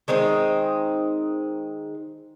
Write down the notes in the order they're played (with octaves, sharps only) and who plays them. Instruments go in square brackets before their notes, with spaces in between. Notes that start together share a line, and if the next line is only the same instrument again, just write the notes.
[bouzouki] D#3 G#3 C4 D#4